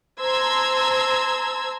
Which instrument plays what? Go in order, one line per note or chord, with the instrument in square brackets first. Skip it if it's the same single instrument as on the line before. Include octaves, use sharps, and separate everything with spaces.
[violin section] C5 A5 A#5 C6 E6 G#6